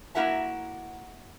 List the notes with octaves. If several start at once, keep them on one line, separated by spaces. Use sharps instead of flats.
A#3 E4 F#4 A#4 E5 A5